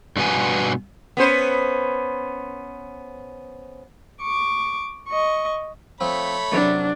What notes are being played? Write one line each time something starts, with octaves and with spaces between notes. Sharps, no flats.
G2 B2 B3 G#5
B3 C#4 C5
C#6 D6
D#5 C#6
F3 A3 C4 C#5 B5
F#2 C3 F#3 D4